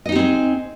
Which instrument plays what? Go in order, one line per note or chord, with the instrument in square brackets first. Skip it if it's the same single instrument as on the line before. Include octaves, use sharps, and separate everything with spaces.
[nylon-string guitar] D#5
D#4
G4
C4
G#4